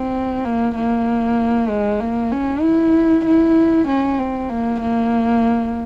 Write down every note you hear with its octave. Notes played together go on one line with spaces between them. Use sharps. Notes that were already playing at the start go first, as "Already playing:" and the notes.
Already playing: C4
A#3
A#3
G#3
A#3
C#4
E4
E4
C#4
C4
A#3
A#3